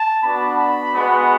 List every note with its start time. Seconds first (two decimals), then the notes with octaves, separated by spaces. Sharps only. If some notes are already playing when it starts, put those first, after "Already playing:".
Already playing: A5
0.23 B3 D4 F#4 B5
0.59 B5
0.95 G#3 B3 F#4